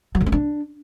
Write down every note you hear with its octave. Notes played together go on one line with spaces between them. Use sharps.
F#3
D3
C4
D4